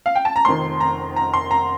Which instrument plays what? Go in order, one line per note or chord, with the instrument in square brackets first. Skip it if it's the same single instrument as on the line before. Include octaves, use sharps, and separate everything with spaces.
[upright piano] F5
G5
A5
A#5
F1 F2 D#3 C6
A#5
A#5
C6
A#5